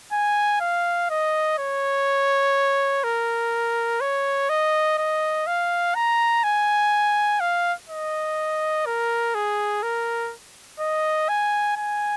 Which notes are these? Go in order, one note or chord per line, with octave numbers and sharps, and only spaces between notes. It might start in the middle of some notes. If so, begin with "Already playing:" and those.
G#5
F5
D#5
C#5
A#4
C#5
D#5
D#5
F5
A#5
G#5
F5
D#5
A#4
G#4
A#4
D#5
G#5
G#5